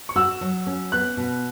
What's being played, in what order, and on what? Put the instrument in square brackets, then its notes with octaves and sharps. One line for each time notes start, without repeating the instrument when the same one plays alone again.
[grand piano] C#6
[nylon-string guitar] F#4 [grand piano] E6
[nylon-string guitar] F#3
C#4
[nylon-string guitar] B3 [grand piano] F#6
[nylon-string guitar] B2